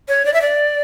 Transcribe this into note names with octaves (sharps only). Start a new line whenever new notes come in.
C#5
D5
E5
D5